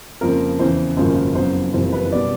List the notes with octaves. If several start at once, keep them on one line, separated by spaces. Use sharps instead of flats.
F2 C#3 F3 A#3 A#4
E2 C#3 E3 C5
G#1 F#2 C#3 F3 A#3 C5
F#1 F2 C#3 F#3 B3 C5
F#1 F2 C3 E3 G3 C5
B4
B2 G3 B3 D5